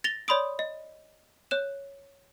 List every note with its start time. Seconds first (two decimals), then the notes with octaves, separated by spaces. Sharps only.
0.04 A6 A#6 F7 G7
0.28 C#5 D5 B5 C6 D#6 D7
0.59 D#5
1.51 C#5 F#6 E7